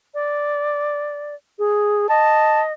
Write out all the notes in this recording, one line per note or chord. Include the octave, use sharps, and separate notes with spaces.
D5
G#4
D#5 A5